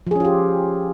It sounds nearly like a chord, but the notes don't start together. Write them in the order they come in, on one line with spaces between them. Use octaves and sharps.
F3 G#4 C#4 F4 G4